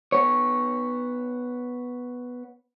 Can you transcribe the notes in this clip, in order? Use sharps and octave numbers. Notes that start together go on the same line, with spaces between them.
B3 C#5